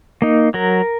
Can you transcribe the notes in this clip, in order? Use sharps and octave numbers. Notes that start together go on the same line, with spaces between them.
A#3 D#4
F#3 A#4